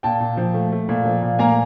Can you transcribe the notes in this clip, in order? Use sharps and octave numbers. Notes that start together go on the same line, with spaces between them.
A#2 G5 A5
A#2
F3
A3
A3
A#2
F3
A#2
A#3 G#5 A#5